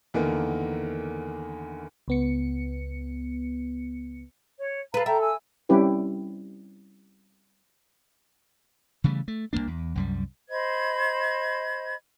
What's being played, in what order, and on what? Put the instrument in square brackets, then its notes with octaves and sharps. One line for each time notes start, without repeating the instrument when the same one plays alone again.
[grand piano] E2 D3 D#3 A#3
[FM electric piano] C#2 B3 C#7
[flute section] C#5
[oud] A4 B4 [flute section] F5 A#5
[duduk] A4 [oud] E5 [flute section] G5 A#5
[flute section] G#5 E6
[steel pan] G3 C4 C#4 E4 G4 B4
[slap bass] C#3 E3 G3 A3
A3
C2 A#2 A#3 D4
E2
C2 F#2 G3
[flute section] C5 D#5 B5 G#6